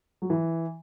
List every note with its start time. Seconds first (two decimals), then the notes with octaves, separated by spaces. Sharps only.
0.22 F#3
0.30 E3